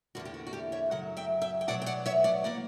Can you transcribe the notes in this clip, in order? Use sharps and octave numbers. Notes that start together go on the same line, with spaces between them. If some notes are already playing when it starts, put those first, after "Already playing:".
E2 D3 A#3 D4 F#4
G4
F#4
F#4
E4 G4
C#5 E5
F#2 C#3 F#3 F#5
E5 G5
E5 G5
G5
B2 F#3 B3 D5 F#5
G5
D5 F#5
C#5 E5
D5 F#5
E3 A#3 D5 F#5